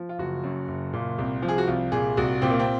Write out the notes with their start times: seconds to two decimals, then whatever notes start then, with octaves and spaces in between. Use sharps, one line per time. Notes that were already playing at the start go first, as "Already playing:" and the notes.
Already playing: F3
0.09 F4
0.18 F#1 F#4
0.43 F#2
0.68 F#1
0.93 A#2
1.18 C2
1.42 F3
1.48 G#4
1.58 F#4
1.67 C2 F4
1.92 A#2 G#4
2.17 C2 F#4
2.42 A#2 C4
2.50 A#3
2.59 C4